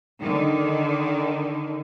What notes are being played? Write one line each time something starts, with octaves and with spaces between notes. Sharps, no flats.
D3 D#3